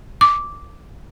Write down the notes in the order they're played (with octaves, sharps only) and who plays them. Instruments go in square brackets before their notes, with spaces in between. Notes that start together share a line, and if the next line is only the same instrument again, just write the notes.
[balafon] D6